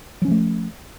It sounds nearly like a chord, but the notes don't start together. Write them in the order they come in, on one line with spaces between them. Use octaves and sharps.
F#3 C#4 F3 A3